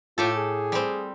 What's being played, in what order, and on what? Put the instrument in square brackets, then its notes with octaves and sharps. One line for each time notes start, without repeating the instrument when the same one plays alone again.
[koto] A2 G4 A4 [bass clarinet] F4
[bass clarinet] G#4
[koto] G3 C4